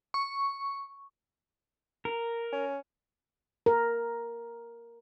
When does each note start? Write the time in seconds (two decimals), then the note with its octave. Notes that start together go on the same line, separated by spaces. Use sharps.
0.14 C#6
2.05 A#4
2.53 C#4
3.66 A#4